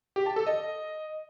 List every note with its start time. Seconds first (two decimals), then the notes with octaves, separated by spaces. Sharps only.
0.16 G4
0.26 A5
0.36 A4
0.47 D#5